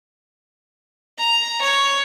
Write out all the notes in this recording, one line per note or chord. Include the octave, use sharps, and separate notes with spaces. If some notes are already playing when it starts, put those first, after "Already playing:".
A#5
C#5